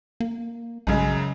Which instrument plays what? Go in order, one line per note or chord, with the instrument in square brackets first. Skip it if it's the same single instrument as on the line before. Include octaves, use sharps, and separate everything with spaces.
[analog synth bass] A#3
[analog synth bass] A#1 [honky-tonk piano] F#2 C#3 G#3